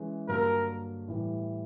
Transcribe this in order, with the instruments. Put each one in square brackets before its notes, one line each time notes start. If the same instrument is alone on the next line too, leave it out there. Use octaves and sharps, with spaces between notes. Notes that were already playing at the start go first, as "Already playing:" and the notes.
Already playing: [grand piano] E3 G#3 C#4 E4
[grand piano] G2 D3 F#3 A#3 [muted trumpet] A#4
[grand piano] A2 E3 G3